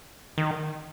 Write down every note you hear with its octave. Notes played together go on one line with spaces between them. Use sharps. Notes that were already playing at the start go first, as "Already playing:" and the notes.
D#3